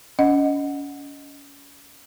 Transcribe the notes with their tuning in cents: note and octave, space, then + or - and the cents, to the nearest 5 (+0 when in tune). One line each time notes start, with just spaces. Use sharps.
C#4 +30 D#5 +0 F#5 +0